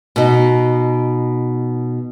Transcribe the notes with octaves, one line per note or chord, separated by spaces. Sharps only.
B2 D#4